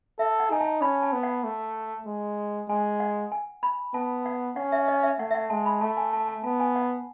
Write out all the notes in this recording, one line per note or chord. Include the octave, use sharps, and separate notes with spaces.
A4 E5
F#5
D#4 G#5
A5
C#4 B5
A5
B3
F#5
A3
G#3
G#3 G#5
F#5
G#5
B5
B3 A5
F#5
C#4 F#5
E5
D#5
E5
A3 F#5
E5
F#5
G#3 A5
B5
A3 A5
G#5
A5
A5
B3 A5
G#5
F#5